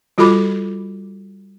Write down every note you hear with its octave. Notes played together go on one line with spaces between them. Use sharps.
G3 F4 F#4 A4 B5 D6